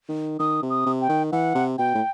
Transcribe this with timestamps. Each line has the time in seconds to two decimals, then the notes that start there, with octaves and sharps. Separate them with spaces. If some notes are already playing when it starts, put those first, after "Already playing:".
0.09 D#3
0.39 D#3 D#6
0.62 C3
0.70 D#6
0.86 C3
1.01 G5
1.09 D#3
1.32 E3 F#5
1.55 C3
1.78 B2 G5
1.95 A2